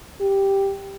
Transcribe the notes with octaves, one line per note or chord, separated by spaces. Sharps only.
G4